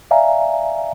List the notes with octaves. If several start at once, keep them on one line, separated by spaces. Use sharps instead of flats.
D5 E5 F5 G#5 A#5